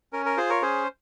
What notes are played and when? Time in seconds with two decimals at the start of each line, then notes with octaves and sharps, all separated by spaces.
0.13 C#4 A#4
0.26 A#4
0.37 F4 G#4 C5
0.50 A#4 C#5
0.62 C#4 G#4 C5